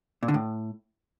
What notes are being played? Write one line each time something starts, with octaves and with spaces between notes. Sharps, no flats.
A#2
D3
A2